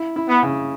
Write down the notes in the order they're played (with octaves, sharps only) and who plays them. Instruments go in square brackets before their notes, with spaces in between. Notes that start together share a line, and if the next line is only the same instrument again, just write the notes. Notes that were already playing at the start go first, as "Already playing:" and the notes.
Already playing: [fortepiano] E4
E4
[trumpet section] B3
[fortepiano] C#3